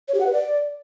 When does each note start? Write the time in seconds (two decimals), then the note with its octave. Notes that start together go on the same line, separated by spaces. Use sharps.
0.08 C#5
0.14 G4
0.20 F#5
0.27 B4
0.33 D5